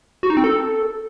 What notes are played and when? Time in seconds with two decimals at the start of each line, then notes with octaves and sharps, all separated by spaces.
0.23 F#4
0.30 D#4
0.37 C4
0.44 A4